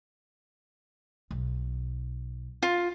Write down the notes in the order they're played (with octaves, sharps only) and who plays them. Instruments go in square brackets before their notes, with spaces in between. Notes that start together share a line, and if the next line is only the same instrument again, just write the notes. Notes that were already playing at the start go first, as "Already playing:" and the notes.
[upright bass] B1
[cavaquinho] F4